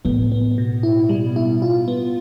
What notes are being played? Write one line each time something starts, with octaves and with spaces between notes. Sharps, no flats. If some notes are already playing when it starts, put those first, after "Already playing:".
A2 B3
B3
B2
E4
G3
E4
F4
B3